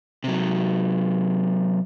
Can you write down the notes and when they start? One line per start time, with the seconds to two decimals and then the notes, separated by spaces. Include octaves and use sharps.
0.24 C3 F#3